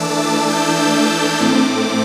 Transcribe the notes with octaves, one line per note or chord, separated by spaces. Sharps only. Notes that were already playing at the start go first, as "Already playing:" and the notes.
Already playing: E3 A3 D4 A5 D6 E6
D6
G6
E6
D6
A2 A3 C4